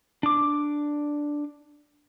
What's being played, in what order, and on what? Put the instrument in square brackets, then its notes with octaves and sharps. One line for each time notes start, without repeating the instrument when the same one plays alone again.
[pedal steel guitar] D4 D6